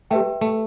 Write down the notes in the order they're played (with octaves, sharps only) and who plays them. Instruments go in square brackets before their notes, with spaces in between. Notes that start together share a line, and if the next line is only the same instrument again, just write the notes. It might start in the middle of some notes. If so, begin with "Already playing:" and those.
[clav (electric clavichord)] A3 [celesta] G4 B4 E5 G5
[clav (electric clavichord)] A3